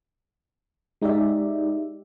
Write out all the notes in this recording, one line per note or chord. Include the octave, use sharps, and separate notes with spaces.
G#3 D#4 G4 D5 E5